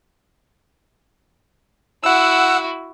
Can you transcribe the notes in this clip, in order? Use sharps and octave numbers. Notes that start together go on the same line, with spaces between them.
E4 F#4 F#5 E6